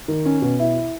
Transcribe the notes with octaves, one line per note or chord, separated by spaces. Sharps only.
D#3
C#4
B2
E4